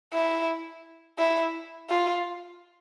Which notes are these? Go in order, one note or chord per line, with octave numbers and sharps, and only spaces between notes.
E4
E4
F4